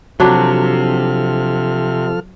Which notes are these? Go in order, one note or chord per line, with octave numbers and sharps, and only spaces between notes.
C3 F3 F#3 D4 A4 F6